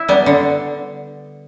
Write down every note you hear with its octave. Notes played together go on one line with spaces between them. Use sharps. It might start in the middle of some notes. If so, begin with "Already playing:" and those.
Already playing: E4
G3 B3
D3